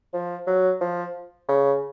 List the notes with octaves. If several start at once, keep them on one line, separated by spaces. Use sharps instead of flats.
F3
F#3
F3
C#3